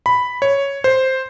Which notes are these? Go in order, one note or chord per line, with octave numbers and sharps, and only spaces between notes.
B5
C#5
C5